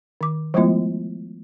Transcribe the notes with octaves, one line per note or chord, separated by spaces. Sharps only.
D#3 D6
F3 G#3 A3 B3 E4 F4